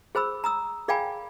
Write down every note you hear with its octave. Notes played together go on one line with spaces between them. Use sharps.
G#4 C5 B5 E6
A#5 D#6 E6
G#4 D5 F5 G5 G#5 B5